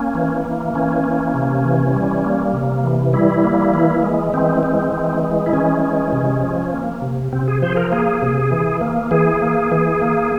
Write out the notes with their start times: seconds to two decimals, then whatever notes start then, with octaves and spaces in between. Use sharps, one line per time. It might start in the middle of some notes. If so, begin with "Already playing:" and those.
Already playing: A#3 C#4
0.15 E3
0.44 A#3
0.74 E3 C#4
1.04 A#3
1.34 C3
1.64 E3
1.94 G3
2.24 A#3
2.53 C3
2.84 E3
3.13 G3 E4
3.44 A#3
3.74 E3
4.03 G#3
4.33 E3 C4
4.63 G#3
4.93 E3
5.23 G#3
5.46 E4
5.53 E3 C#4
5.82 G#3
6.13 C3
6.43 F3
6.73 A#3
7.02 C3
7.32 C3 C4
7.48 G#4
7.62 F3 C5
7.72 G#4
7.76 A#4
7.92 A#3 G#4
8.22 C3
8.51 E3
8.81 A#3
9.11 E3 G#4
9.42 A#3
9.72 E3
10.01 A#3